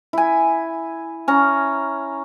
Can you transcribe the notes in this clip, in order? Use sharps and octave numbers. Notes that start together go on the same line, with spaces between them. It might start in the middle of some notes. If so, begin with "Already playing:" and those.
E4 G#5
C#4 A#5